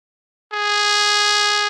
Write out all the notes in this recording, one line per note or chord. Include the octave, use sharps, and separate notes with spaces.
G#4